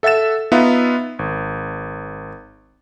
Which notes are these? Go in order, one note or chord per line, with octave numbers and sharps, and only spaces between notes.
A4 E5 F#5 A6 E7
B3 D#4 F4 B4 E5 F5
G#1